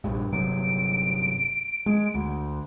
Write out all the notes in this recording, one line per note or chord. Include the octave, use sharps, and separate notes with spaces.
A#1 G2
G1 C3 F#3 D7
G#3
D2